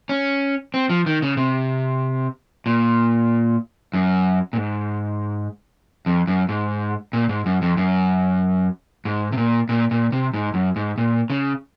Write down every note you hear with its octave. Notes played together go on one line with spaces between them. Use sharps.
C#4
C4
F3
D#3
C#3
C3
A#2
F#2
A#2
G#2
F2
F#2
G#2
A#2
G#2
F#2
F2
F#2
G#2
C3
A#2
A#2
A#2
C3
G#2
F#2
G#2
A#2
C#3